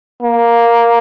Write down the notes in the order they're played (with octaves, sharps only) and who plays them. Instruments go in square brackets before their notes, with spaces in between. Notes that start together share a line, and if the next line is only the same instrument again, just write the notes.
[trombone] A#3